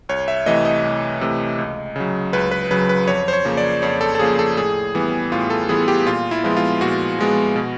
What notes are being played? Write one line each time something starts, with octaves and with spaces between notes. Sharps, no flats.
C2 C#5
E5
C3 E3 A3 D#5
D#5
C2
C3 E3 A3
C#2
C#3 F#3
C#2 B4
B4
C#3 F#3 B4
B4
F2 C#5
C5
C#5
C#3 F3 A#3
D5
F2 C#5
A4
A4
C#3 F3 A#3 G#4
A4
A2 G#4
E3 G3 B3
A2 F4
A4
E3 G3 B3 G#4
G4
A#2 F4
E4
F3 G#3 B3
F4
A#2 F#4
F3 G#3 B3
B2